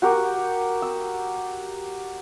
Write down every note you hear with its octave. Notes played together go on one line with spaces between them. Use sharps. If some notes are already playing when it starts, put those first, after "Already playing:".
F#4 G4 A#4
E6